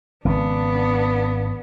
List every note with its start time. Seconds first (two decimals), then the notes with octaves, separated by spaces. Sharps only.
0.25 G#1 C#3 B3 D4